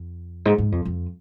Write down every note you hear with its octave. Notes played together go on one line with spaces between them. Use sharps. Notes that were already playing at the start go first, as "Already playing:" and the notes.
Already playing: F2
G#2
G#2
F2
F2